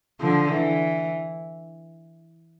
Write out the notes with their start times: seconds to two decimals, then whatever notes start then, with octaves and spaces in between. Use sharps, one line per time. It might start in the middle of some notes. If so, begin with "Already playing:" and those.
0.21 D3 F3
0.52 E3